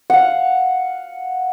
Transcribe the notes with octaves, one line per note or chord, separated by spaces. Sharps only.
F5 F#5